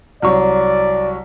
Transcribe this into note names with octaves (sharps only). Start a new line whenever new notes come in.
C2 F#3 D5 C#6